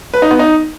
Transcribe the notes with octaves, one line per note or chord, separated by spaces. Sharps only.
B4
D#4
B3
D#4